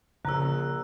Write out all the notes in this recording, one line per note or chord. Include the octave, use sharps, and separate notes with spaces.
A#1 C#3 A#5 E6 F#6